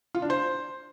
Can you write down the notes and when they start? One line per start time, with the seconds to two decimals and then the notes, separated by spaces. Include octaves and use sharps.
0.15 F4
0.22 D4
0.30 C5